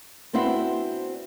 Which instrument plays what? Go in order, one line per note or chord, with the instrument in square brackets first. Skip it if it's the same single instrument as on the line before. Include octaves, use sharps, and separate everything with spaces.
[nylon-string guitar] B3 C4 D4 E4 F#4 C5